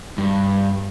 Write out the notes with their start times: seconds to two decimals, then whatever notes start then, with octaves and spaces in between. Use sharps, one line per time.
0.18 G2